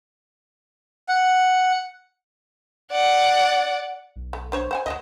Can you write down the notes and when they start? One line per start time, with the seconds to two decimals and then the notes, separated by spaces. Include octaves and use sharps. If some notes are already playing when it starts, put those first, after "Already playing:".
1.09 F#5
2.92 D5 F#5
4.16 B1
4.33 A3
4.52 D4 C5 C#5
4.71 C5 F#5 G#5
4.86 D2 F#3 A#3 D#5